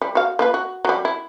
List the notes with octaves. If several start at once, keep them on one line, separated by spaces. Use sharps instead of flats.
G3
F#4 F5
A#3 F4 B4
F#4
F#3 G3
E4